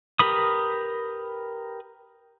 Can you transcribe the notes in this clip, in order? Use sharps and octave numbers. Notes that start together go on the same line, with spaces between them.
G4 A#4 B4 B5 D#6